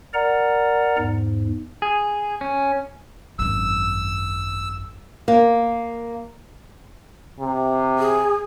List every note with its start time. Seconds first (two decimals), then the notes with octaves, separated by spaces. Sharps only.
0.14 A#4 D5 F#5 A#5
0.98 E2 G#2
1.82 G#4
2.41 C#4
3.39 G#1 F#2 E6
5.28 A#3
7.40 C3
7.99 G#4